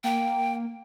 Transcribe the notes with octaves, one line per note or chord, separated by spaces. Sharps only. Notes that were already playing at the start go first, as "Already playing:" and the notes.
A#3 G5